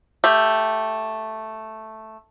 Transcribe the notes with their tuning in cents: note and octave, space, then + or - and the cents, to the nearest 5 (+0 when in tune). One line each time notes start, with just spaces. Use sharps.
A3 +0 G4 +0